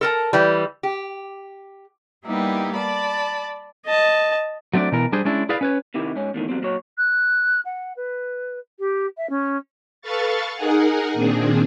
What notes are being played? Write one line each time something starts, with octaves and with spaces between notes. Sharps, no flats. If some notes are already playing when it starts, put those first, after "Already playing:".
A4 A#4 A5
E3 G3
G4
G3 A#3 B3 D#4 E4 G4
D5 A5 B5
D#5 A5
F#3 A3 C4 D4 D5
B2 E3 A#4
G3 D4 G#4 C5
G#3 C#4 D4 E4
E4 G#4 B4 D5 F5
C#4 B4 C#5
C3 D#3 E4 G4
G#2 C#4
E2 A2 D#3
E2 E3 F#3 G3 C4
A#2 F#3 C#5
F#6
F#5
B4
G4
E5
C#4
A4 B4 F5 C#6 A6
D#4 G#4 A#4 F#5 G#5
A#2 D#3 C4 D4 G#4